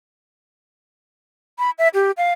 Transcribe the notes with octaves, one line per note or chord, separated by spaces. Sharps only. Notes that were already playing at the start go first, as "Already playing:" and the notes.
B5
E5
G4
F5